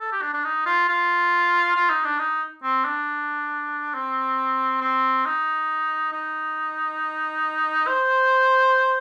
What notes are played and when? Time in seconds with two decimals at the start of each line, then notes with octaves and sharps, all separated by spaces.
0.01 A4
0.12 G4
0.22 D4
0.33 D4
0.44 D#4
0.66 F4
0.88 F4
1.76 F4
1.90 D#4
2.04 D4
2.19 D#4
2.63 C4
2.85 D4
3.94 C4
4.81 C4
5.25 D#4
6.13 D#4
7.87 C5